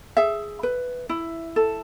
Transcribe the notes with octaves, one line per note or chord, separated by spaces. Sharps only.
G#4 E5
B4
E4
A4